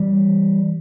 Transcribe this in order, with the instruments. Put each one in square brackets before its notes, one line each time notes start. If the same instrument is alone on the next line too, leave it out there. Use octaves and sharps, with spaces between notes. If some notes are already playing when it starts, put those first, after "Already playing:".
Already playing: [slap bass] E3 G3